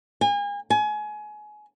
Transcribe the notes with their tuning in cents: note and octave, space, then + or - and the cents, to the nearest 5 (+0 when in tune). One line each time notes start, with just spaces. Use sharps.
G#5 -35
G#5 +25